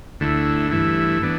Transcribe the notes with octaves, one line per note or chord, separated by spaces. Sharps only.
D2 D3 A3 E4
G2 E3 A3 E4
E3 B3 D4